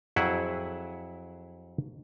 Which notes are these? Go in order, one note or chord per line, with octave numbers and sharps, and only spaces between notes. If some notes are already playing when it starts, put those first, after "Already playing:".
F2 F#3 E4 G#4 E5 F#5